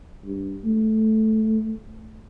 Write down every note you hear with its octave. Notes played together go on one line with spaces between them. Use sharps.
G2
A3